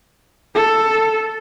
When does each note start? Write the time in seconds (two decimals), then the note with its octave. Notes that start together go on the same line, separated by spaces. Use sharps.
0.55 A4